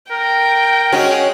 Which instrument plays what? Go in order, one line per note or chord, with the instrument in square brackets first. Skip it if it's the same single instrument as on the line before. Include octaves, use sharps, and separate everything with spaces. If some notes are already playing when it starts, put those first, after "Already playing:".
[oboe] A#4 [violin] G5
[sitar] G#3 C#4 F#4